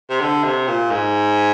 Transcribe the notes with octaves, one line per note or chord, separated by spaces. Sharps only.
C3
D3
C3
A#2
G#2